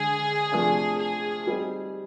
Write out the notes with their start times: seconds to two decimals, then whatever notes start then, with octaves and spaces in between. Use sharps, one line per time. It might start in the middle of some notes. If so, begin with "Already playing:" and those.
Already playing: D3 G#3 G#4
0.52 C3 F3 A3 D4
1.00 G#4
1.47 G3 C4 D#4